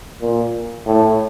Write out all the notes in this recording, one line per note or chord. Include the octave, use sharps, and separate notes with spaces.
A#2
A2